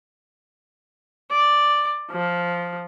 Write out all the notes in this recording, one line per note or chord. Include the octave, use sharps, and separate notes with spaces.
D5
F3